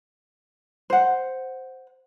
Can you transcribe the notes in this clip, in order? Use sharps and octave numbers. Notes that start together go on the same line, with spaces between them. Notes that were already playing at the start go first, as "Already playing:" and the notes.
C5 F#5